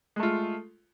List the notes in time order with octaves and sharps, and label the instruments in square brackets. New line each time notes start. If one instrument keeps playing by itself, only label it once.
[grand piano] G#3
A3
F4